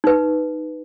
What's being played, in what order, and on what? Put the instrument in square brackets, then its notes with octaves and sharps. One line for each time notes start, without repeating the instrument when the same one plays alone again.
[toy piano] D#4 B4